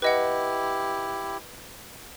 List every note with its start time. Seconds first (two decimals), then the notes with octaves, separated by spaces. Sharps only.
0.02 E4 G4 B4 D#5 F#5